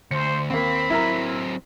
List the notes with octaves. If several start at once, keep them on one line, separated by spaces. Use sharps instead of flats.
D2 C5 C#7
D#2 A#3 C4 B5
F#3 C4 E4 A#4 A#5